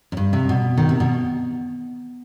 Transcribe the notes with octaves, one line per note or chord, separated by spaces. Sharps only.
F#2
G2
C3
B2
D#3
C3
B2